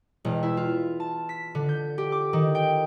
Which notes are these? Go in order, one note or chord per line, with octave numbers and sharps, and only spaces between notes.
E1
E4
F4
A5
B6
D3
G6
G4
D6
D#3
G5